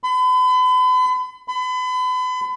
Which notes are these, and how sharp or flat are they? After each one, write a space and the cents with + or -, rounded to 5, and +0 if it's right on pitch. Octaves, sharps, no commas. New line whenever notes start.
B5 +40
B5 +35